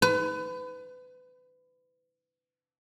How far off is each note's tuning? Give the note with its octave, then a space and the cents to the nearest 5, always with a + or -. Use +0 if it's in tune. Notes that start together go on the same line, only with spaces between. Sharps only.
B4 +30